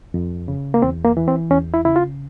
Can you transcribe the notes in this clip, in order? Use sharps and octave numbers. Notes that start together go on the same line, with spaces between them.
F2
C#3
A#3
E2 C4
A#3
E3
C4
E2 C#4
E4
C#3 E4
F4